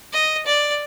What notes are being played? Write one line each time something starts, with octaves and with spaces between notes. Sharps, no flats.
D#5
D5